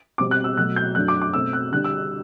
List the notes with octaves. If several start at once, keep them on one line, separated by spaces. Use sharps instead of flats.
B2 G3 C4 D6
F#6
E6
B2 F#3 A3 F#6
G6
F#2 F#3 A3 D4 F#6
D6
D6
B2 A3 C4 E6
F#6
D3 G3 D4 F#6
E6